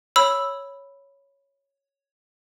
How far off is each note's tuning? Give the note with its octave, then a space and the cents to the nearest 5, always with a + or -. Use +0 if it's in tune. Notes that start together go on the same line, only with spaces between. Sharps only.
C#5 +0 B5 +0 E6 +0